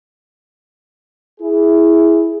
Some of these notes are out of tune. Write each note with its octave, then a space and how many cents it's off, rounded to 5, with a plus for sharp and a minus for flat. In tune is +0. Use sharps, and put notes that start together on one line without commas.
E4 +0 G#4 +5